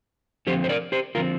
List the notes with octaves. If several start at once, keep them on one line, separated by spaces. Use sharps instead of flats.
D3 F3 C4 G4 C5
C5
A#4 D5
G4 C5
D3 F3 C4 F4 A#4